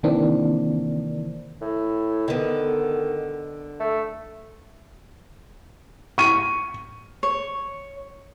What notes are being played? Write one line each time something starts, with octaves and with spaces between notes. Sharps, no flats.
C3 D#3 E3 A#3 C4 D4
A2
D3 D#3 B3
A3
C#6 D#7
C#5